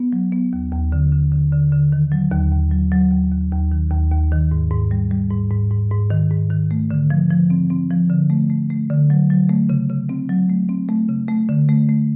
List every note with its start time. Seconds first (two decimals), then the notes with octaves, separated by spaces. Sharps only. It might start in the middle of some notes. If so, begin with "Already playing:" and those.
Already playing: B3
0.13 F#3
0.32 B3
0.53 D#2
0.72 D#2
0.92 D3
1.12 D3
1.32 D3
1.53 D3
1.72 D3
1.92 D#3
2.12 F#3
2.32 D#2
2.52 D#2
2.71 F#3
2.92 F#3
3.12 D#2
3.32 D#2
3.52 D#2
3.72 D#3
3.91 D#2
4.11 D#2
4.32 D#3
4.52 G#2
4.71 G#2
4.91 G3
5.11 G3
5.31 G#2
5.51 G#2
5.71 G#2
5.91 G#2
6.10 D#3
6.31 G#2
6.51 D#3
6.71 A3
6.91 D3
7.10 F3
7.30 F3
7.50 C4
7.70 C4
7.91 F3
8.10 D3
8.30 A3
8.50 A3
8.70 A3
8.90 D3
9.10 F#3
9.30 F#3
9.49 A3
9.69 C#3
9.89 C#3
10.09 C4
10.29 F#3
10.49 A3
10.69 C4
10.89 A3
11.09 C#3
11.29 A3
11.49 D3
11.69 A3
11.89 A3